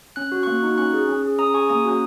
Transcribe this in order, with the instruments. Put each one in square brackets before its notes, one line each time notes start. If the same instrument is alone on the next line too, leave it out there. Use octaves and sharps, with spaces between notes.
[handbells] C#4 F#6
F#4
A#3 C#6 F#6
D#4 F#4
C#4 C#6 F#6
G#4
C#4
G#4
C#4 A#5 D#6
G#4 G#5 C#6
A#3 A#5 D#6
C#4 F#4